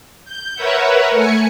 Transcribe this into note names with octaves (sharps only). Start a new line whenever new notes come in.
G6
A#4 B4 C#5 E5 F#5
A3 G#5 C#7